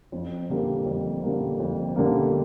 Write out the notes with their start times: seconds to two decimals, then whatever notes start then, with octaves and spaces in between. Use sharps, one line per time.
0.12 F2
0.49 D3 G3 A#3
0.86 F2
1.23 D3 G3 A#3
1.60 F2
1.96 D3 G3 A#3